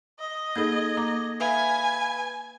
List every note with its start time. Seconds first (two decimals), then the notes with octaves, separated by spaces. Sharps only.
0.20 D#5
0.56 A#3 D#4 G#4 A4 G#6
0.97 A#3 A#5 D6
1.40 B4 E5 F5 G#5 B5